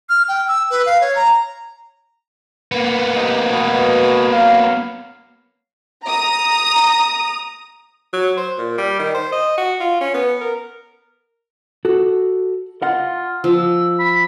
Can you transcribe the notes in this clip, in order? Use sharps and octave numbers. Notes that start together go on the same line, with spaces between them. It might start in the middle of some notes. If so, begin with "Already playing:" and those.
F6
G5
E6
B4
F5
C#5
A#5
A#3 B3
C3 D#4
B2
F#3 F5
A#5 D#6
F#3
C5
A#2
G3
D#3
C5
D#5
F#4
F4
C#4
B3
A#4
F#4 A4
F4 D#5 F5 F#5
F3 E6
B5